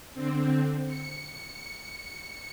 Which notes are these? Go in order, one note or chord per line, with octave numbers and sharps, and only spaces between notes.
D3 C4
C#7